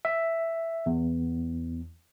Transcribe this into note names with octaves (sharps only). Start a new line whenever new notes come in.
E5
E2